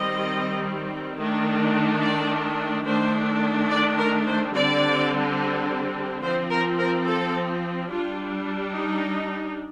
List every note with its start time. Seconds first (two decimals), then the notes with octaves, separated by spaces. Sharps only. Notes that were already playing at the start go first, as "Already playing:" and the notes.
Already playing: D#3 G3 C4 D#5
1.17 D#3 A3 D4
2.02 D5
2.86 D#3 A3 D4 C5
3.70 D5
3.98 A#4
4.26 C5
4.54 D3 G3 C4 D5
6.22 F3 C4 C5
6.51 A#4
6.78 A#4
7.06 A4
7.90 G3 D4 F4
8.74 D#4